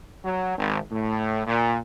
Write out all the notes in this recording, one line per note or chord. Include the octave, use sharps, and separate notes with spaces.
F#3
G#1
A2
A#2